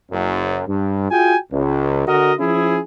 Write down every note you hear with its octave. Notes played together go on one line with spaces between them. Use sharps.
F#1 F#2
G2
F4 F#4 G#4 G5 G#5
C#2
D3 F#4 A#4 D#5
F3 C#4 E4 G#4